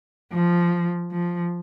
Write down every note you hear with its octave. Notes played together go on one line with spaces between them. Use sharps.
F3
F3